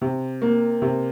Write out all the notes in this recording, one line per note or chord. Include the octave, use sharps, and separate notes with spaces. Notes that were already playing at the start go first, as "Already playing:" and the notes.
C3
A#3
C3